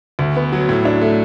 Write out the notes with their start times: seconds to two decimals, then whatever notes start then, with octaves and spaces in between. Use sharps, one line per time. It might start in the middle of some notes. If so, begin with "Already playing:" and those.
0.19 D2
0.36 B3
0.52 F#3
0.69 A2
0.85 D4
1.02 A3